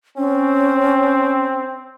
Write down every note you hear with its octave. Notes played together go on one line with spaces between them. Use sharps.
C4 C#4